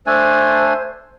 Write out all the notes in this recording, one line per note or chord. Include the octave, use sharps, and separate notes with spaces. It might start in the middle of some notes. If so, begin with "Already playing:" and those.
A3 D4 C5 G#5